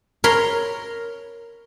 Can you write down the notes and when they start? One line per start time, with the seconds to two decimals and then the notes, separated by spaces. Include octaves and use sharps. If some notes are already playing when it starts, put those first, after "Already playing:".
0.24 A#4 C#5 B5 C6